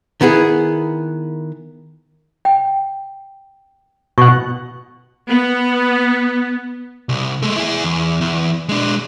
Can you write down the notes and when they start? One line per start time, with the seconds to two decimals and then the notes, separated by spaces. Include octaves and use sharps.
0.21 D#3 B3 E4 G#4
2.45 G5
4.18 B2 F#5 C#6
5.28 B3
7.09 C2
7.42 G#3 A3
7.56 E4 G#4
7.84 E2
8.21 E2
8.69 G#3 D4